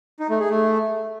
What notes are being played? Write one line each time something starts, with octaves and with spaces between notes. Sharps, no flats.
D#4
A3
G#4
A3